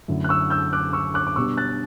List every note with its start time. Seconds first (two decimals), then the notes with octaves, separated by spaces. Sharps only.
0.08 F#2 D3 A3 E4
0.24 F#6
0.29 C#6 E6
0.50 E6 G6
0.73 D6 F#6
0.93 C#6 E6
1.14 D6 F#6
1.27 D6
1.36 B2 G3 B3 D4 C#6 E6
1.57 F#6 A6